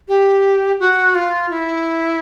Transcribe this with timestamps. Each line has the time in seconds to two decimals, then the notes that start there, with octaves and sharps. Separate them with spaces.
0.08 G4
0.80 F#4
1.15 F4
1.50 E4